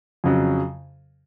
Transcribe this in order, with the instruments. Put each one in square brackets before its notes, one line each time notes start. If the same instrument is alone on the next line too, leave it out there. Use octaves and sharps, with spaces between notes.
[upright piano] F2 C#3 F#3